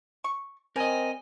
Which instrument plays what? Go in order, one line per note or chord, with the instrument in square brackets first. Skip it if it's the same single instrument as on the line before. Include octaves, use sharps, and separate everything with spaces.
[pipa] C#6
[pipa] G3 [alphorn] C4 [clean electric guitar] A#4 D#5 [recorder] G#5